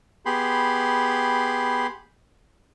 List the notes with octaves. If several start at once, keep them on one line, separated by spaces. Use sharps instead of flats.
B3 G4 G#4 B5 C6